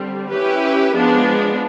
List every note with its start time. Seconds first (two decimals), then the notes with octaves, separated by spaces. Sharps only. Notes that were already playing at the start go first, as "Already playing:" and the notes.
Already playing: D3 G3 C4
0.31 C#4 E4 G4 B4
0.94 F3 G#3 B3 D4